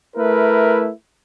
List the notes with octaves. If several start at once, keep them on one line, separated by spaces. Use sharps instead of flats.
A3 E4 A#4 B4